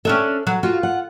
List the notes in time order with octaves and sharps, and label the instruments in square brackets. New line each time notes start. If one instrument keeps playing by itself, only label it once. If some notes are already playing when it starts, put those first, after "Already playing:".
[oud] C#4 D4 E5 [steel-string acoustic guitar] A4
[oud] F#3
[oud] F4 [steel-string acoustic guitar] F#4
[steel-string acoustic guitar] F#5